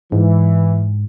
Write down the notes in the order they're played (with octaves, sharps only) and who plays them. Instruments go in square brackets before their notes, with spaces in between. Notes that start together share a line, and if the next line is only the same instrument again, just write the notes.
[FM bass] G#2 [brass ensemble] E3